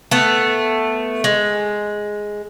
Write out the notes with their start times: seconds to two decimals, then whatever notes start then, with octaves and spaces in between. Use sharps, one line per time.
0.11 A3 B3
1.24 G#3